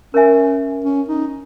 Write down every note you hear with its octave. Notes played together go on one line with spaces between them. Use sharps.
C#4 A#4 C#5 E5 G#5
C#4
D#4